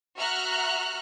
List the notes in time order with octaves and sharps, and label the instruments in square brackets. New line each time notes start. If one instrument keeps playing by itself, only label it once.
[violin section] F#4 E5 A#5 F6 F#6